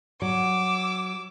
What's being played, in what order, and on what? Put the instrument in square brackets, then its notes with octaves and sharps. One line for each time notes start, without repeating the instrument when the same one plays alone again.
[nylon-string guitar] F#3 [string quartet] D6 E6